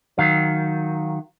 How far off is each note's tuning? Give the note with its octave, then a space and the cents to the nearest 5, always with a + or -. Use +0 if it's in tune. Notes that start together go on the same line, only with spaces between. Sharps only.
D#3 +0 F#3 +0 F5 +0